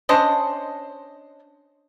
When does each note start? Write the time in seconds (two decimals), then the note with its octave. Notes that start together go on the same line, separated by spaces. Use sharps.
0.09 C#4 D4 C5 D#5